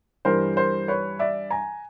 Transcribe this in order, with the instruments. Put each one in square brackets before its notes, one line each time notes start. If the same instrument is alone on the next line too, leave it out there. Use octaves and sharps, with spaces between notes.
[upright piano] G2 E3 G3 A#4 C5
A#4 C5
B4 C#5
D5 E5
G#5 A#5